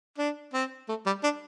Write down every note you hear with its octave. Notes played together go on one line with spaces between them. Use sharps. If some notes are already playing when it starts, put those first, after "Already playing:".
D4
C4
A3
G3
D4